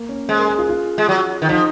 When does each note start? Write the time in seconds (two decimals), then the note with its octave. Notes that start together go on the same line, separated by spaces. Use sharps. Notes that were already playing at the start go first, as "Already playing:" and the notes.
Already playing: A#3
0.09 C#4
0.28 G#3 C5
0.39 A#4
0.49 G#4
0.58 F4
0.69 F4
0.98 G#3
1.09 F#3
1.42 D#3
1.49 F3 D#4